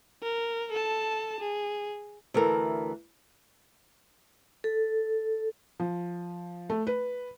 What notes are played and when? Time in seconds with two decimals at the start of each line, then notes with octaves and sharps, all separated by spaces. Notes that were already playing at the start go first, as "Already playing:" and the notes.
0.22 A#4
0.72 A4 A5
1.40 G#4
2.34 D2 E3 A4 A#4
4.64 A4
5.80 F3
6.70 A3
6.87 B4